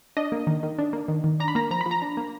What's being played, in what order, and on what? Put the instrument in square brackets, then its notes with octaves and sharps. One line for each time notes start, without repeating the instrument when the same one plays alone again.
[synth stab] D4 D#5
A#3
D#3
D#3
D4
A#3
D#3
D#3
D4 A#5
B5
A#3 A#5
F3 A#5
B5
F3
A#5
D4
A#3